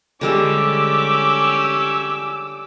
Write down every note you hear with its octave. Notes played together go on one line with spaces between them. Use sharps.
D3 G3 G#3 C#4 G4 D6 E6